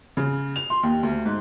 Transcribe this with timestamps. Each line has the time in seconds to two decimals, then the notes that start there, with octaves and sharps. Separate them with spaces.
0.17 C#3
0.56 F7
0.70 C6
0.83 D#2
1.03 D2
1.25 G#2